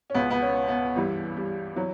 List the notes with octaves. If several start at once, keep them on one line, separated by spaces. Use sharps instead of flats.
C#4
C#2 B2 B3
B3
C#4
B3
G2 E3 G3
G3
E3 F#3